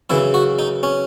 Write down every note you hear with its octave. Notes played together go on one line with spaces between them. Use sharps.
F#2 C#3 E3 E4
F#4
D#4
C#4